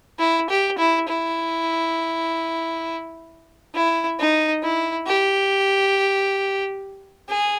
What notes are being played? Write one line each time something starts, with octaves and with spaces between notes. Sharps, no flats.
E4
G4
E4
E4
E4
D#4
E4
G4
G#4